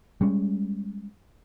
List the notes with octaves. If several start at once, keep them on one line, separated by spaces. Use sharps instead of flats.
G3 G#3 C#4